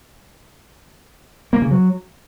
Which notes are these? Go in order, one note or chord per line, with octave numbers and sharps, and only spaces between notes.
A#3
C#3
F#3